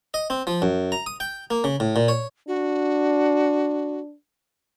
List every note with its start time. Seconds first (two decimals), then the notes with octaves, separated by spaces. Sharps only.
0.14 D#5
0.30 C4
0.47 F3
0.62 F#2
0.92 A#5
1.06 D#6
1.20 G5
1.51 A#3
1.64 C#3
1.80 A2
1.96 A#2
2.08 C#5
2.48 D4 F#4